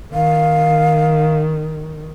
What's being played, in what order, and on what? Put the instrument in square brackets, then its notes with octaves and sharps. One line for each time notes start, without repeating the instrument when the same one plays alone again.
[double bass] D#3 [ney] F5